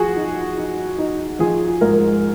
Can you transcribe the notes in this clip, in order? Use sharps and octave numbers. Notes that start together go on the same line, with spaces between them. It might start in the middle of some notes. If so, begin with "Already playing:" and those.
Already playing: F3 F#4 G#4
D#4
D#4
D#4
F3 G#4
G#2 A#4